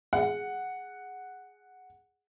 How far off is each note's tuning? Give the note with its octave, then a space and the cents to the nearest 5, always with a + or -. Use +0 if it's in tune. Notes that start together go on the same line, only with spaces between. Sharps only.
G#4 +0 F#5 +0